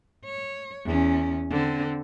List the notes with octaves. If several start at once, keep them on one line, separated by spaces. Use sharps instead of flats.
C#5
E2 C#4
D3 C4